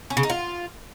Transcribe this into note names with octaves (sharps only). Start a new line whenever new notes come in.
C#4
C#3
D#4
F4